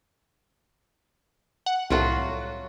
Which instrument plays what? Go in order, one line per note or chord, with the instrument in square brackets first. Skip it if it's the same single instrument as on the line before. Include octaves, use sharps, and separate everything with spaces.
[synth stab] F#5
[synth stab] C2 A2 [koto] F#3 F4 F#4